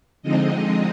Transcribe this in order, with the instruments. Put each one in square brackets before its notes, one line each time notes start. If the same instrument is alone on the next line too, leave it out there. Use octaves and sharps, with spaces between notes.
[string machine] D3 F3 G#3 C4 D#4 D#5